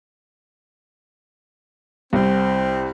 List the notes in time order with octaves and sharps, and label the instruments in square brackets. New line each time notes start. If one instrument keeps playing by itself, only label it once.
[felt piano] C2 [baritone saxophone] C4